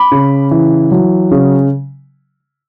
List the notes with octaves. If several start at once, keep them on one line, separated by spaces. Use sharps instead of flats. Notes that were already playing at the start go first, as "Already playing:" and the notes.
Already playing: B5 D6
C#3
E3
F#3
C#3